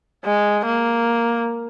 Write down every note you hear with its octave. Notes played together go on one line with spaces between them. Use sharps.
G#3
A#3